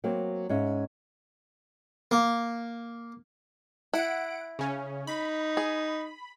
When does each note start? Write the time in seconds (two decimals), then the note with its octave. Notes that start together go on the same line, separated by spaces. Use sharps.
0.04 F#3 A#3 C4
0.49 G#2 C#4 E5 F5
2.11 A#3
3.94 E4 F#5 D7
4.59 C#3 C#4
5.07 D#4 B5
5.57 G#4